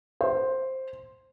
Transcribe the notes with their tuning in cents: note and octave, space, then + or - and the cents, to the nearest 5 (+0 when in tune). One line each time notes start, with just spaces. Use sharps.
C5 +5